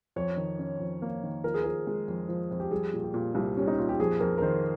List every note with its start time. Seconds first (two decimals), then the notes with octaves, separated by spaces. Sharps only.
0.16 F2 C#5
0.37 D#3
0.59 C#4
0.80 F2
1.02 A#3
1.23 D#3
1.44 F3 A#4
1.54 G#4
1.64 F3 A#4
1.87 G#3
2.08 F2
2.28 F3
2.51 F2
2.60 G4
2.71 G3 G#4
2.93 A#2
3.04 G4
3.14 A#2
3.35 C2
3.57 G3 C#4
3.68 D#4
3.78 A#2 F4
3.89 G4
4.00 F2 G#4
4.20 F2 A#4
4.38 A#4
4.42 D#3 C5